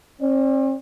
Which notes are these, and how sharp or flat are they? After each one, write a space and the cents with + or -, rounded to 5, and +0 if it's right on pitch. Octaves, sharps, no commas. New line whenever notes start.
C4 +45 D5 +0